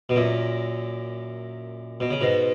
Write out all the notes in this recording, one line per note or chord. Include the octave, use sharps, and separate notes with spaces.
B2
F#2 A#2
B2
C#3
G#2 B2